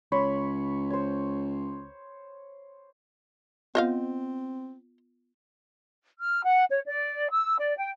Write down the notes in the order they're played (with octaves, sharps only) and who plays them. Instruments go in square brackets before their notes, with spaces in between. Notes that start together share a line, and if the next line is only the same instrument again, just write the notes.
[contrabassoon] C#2 [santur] C#5 B5 C6
[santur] C5 C#5
[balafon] B3 F4 [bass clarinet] C4 [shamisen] C5 D#5 F5
[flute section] F6
F#5
C#5
D5
E6
D5
G5